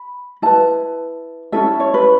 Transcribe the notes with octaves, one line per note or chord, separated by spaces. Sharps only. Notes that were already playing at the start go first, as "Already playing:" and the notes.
Already playing: B5
E4 B4 A5
C#4 E4 A4 E5
C#5
B4